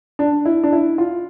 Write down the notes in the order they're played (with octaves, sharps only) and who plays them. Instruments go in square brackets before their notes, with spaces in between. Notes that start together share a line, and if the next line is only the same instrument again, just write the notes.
[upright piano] D4
E4
D4
E4
F4